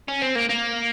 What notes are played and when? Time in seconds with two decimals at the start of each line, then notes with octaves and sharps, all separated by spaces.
0.08 C#4
0.22 C4
0.36 A#3
0.50 A#3